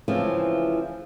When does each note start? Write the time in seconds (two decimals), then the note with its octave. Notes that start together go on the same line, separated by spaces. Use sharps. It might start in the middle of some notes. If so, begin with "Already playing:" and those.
0.08 C#3 E3 F3 G#3 A3 C4